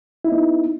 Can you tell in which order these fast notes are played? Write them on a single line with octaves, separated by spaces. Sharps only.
E4 D#4 B3